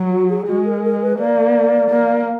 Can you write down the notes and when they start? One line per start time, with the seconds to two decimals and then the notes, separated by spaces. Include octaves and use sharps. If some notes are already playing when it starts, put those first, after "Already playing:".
Already playing: F#3
0.12 F#4
0.30 G#4
0.48 G#3 F#4
0.65 A#4
0.84 A#4
1.02 B4
1.19 A#3 D5
1.91 A#3